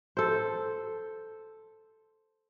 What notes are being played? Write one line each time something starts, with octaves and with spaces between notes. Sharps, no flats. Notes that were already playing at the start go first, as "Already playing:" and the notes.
A4 C5